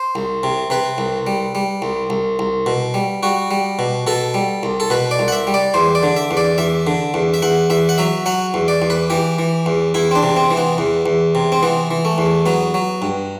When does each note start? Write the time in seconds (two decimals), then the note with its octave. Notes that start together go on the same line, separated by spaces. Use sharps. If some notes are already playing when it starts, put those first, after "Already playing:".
Already playing: C5
0.15 C2
0.43 C3
0.70 C3 B4
0.98 C2
1.27 G3
1.55 G3
1.82 C2
2.10 C2
2.39 C2
2.66 B2
2.94 G3
3.23 G3 F#4
3.51 G3
3.79 B2
4.07 B2 A4
4.34 G3
4.63 C2
4.80 A4
4.90 B2 B4
5.11 D5
5.19 C2
5.28 F#5
5.32 E5
5.47 G3
5.54 D5
5.74 E2 C5
5.95 D5
6.03 D3
6.16 E5
6.31 E2
6.37 D5
6.58 E2 E5
6.87 D3
7.14 E2
7.34 E5
7.42 E2 F#5
7.70 E2 E5
7.89 F#5
7.98 F#3 E5
8.26 F#3 F#5
8.54 E2
8.68 D5
8.82 E2
8.90 B4
9.10 E3 G4
9.38 E3
9.66 E2
9.94 E2 E4
10.11 C4
10.15 D4
10.23 C3
10.36 C4
10.51 E3
10.57 B3
10.78 E2
11.06 E2
11.35 C3
11.52 C4
11.63 E3 B3
11.91 E3
12.05 A3
12.18 E2
12.46 F#3 B3
12.74 F#3
13.02 G2